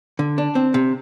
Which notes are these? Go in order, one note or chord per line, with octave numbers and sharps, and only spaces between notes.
D3
D4
C4
C3